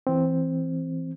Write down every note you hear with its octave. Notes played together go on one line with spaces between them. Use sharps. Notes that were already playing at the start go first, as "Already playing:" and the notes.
E3 C4